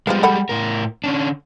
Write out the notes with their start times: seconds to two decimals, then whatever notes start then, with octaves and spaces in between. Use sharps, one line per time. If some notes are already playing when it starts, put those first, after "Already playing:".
0.07 G3 G#3 B3 C4 F4
0.23 A4 F#5 B5
0.49 A2 A#4
1.04 D3 C#4 D4